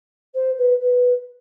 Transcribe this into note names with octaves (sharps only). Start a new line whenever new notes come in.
C5
B4
B4